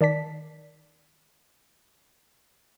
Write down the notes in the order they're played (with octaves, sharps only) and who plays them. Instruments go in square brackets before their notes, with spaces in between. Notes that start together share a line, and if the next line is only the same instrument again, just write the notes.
[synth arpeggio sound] D#3 D5 A5 B6